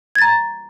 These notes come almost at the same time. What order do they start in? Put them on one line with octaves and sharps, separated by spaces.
G#6 A6 A#5